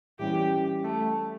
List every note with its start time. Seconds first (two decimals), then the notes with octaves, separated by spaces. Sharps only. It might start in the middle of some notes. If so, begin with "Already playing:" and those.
0.19 E3 G3 C#4 G4
0.84 A3